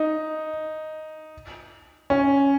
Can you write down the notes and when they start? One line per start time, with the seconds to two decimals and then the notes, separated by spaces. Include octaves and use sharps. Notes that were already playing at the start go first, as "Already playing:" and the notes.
Already playing: D#4
2.10 C#4